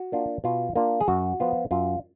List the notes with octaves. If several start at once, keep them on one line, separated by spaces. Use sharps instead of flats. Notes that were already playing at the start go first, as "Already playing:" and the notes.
Already playing: F#4
A#3 D4 F4
B2 F4
A#3 D4 F4
G#4
F#2 F#4
F3 B3 F4
F#2 F4